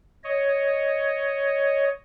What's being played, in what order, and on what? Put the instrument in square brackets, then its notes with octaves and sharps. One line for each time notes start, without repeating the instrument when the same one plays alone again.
[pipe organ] C#5 D#5